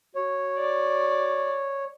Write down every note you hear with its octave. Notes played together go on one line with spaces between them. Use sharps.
F#4 C#5
D5